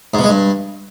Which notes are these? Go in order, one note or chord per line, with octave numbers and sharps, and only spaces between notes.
G#2
B2
G#3
G2